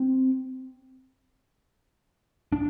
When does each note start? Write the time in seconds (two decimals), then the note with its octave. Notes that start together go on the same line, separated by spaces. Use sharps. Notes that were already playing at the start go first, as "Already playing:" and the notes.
Already playing: C4
2.52 D4